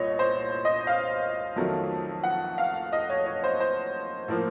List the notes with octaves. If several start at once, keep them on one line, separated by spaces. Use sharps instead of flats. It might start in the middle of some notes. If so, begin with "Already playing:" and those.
Already playing: C2 A#2 C#5 D#5
C5
D#5
F5
F2 D#3 F#3 A3
F#5
F5
D#5
C#5
C#5
C5
C5
A2 F3 A#3